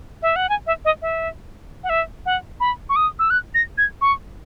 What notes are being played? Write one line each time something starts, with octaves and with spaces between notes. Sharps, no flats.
E5
F#5
G#5
E5
D#5
E5
F#5
E5
F#5
B5
C#6
D#6
E6
F#6
A#6
G#6
C#6